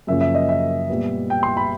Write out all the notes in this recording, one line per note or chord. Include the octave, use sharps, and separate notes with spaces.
F#2 C#3 F3 A#3 C#4 E5
E5
D#5
E5
A#2 G3 B3
G5
C6
B5